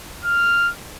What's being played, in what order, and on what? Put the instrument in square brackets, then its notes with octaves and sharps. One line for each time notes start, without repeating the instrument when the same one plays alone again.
[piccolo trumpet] F6